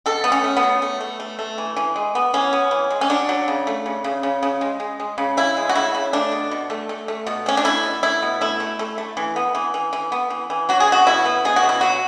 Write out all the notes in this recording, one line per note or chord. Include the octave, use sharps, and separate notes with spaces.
B2 A4
A3 B3
C#4
A3
B3
F#3
A3
A3
A3
A3
E3
E3
G#3
B3
E3 C#4
B3
E3
G#3
C#4
F#3 D4
F#3
C#3
A3
C#3
C#3
C#3
C#3
G#3
G#3
G#3
C#3
C#3 E4
G#3
F#4
C#3 E4
C#3
A3 D4
B2
B2
A3
A3
A3
B2
A3 C#4
D4
A3 E4
B2
A3 E4
B2
A3 E4
A3
A3
A3
E3
B3
E3
E3
E3
B3
E3
E3
F#3 F#4
G#4
B2 F#4
B2 E4
B3
B2 G#4
F#4
B2
E4
F#3 F#4